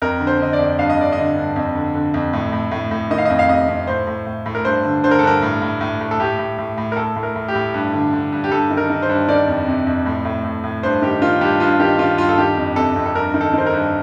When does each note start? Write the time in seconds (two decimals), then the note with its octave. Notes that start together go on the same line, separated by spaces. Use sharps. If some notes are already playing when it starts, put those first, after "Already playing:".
0.02 F2 A#4
0.20 D3
0.27 C5
0.40 D3 D#5
0.53 D5
0.59 F2
0.79 G2 F5
0.90 D#5
0.98 D3 D5
1.12 D#5
1.18 D3
1.36 G2
1.56 F2
1.75 D3
1.94 D3
2.14 F2
2.33 A2
2.53 A2
2.72 A2
2.91 A2
3.11 D#3 D#5
3.18 F5
3.25 F2 D#5
3.39 F5
3.49 C3 D#5
3.68 F2
3.87 A2 C5
4.07 A2
4.26 A2
4.46 A2
4.55 A#4
4.65 G2 C5
4.84 D3
5.04 D3 C5
5.11 A#4
5.19 A4
5.23 G2 A#4
5.42 A2
5.62 A2
5.81 A2
6.01 A2
6.11 A4
6.20 A2 G4
6.39 A2
6.58 A2
6.78 A2
6.92 A#4
6.97 A2 A4
7.16 A2
7.23 A#4
7.36 A2
7.48 G4
7.55 A2
7.74 G2
7.93 D3
8.13 D3
8.33 G2
8.44 G4
8.51 G2 A4
8.70 D#3
8.77 A#4
8.90 D#3
9.02 C5
9.09 G2
9.29 D#3 D5
9.48 F2
9.68 C3
9.87 F2
10.06 A2
10.25 A2
10.45 A2
10.64 A2
10.83 G2 C5
11.02 D#3 G4
11.22 D#3 F4
11.41 G2 G4
11.60 G2 F4
11.80 D#3 G4
11.99 D#3 F4
12.18 G2 F4
12.29 A4
12.38 D#3 G4
12.57 F2
12.76 C3 A4
12.96 F2
13.06 A4
13.15 G2 A#4
13.34 D#3
13.41 A4
13.53 D#3 C5
13.66 A#4
13.73 G2